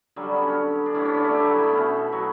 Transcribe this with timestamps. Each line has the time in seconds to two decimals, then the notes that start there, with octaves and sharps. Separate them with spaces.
0.16 D3 F#3 G3 F#4
0.32 B3 C#4
0.46 C#4
0.86 D4
0.94 A2 E3 A3 C#4
1.05 C#4
1.14 D3 D4
1.24 A3 A4
1.34 G3 G4
1.44 F#3 F#4
1.53 E3 E4
1.64 B3
1.73 B2 A3 C#4
2.12 F#3 F#4